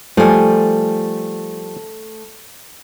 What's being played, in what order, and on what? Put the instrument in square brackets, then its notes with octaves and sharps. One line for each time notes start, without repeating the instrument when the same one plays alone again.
[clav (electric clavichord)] F3 G3 [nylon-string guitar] A3 G#5